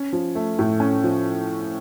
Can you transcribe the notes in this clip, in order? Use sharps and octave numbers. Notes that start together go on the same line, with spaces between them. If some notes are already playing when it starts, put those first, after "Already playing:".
Already playing: C#4
F3
A3
A2
C#4
F3